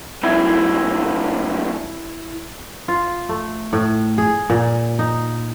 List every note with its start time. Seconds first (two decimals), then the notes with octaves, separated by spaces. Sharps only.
0.23 C2 F#2 E4
2.88 F4
3.29 A3
3.73 A2
4.18 G#4
4.50 A#2
4.99 D#4